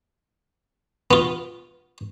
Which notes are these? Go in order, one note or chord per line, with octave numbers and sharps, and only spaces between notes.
B3 F4